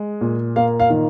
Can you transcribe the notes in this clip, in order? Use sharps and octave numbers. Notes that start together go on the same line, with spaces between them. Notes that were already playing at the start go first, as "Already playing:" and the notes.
Already playing: G#3
A#2
A#3 F5
F5
D#3